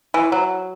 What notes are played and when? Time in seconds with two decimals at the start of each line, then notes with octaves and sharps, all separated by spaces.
0.14 E3
0.32 F#3